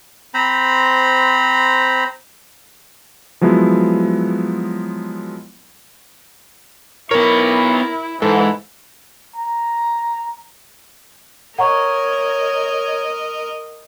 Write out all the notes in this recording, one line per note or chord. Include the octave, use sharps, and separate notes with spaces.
C4 C5 A#5 B5
F3 F#3 G#3 B3 E4
B3 E4 A#4 C#5
G#2 E3 A4
A#5
A#4 C#5 D#5 F#5 A#5 C#6